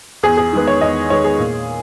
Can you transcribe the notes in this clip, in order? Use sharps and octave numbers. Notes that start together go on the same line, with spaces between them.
E2 G#4
G#4
D#3 G#3 B3
C#5
E2 D#5
D#3 G#3 B3 C#5
G#4
A#2